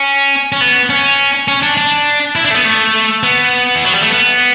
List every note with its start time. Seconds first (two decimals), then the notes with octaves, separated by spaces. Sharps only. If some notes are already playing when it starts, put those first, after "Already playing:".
Already playing: C#4
0.52 C#4
0.61 B3
0.90 C#4
1.48 C#4
1.63 D4
1.77 D4
2.36 E4
2.45 D4
2.51 A3
2.55 B3
2.65 A3
3.23 B3
3.75 E3
3.85 F#3
3.94 G3
4.02 A3
4.10 B3